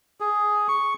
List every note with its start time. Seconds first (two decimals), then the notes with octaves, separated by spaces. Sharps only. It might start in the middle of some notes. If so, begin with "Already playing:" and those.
0.20 G#4
0.68 C#6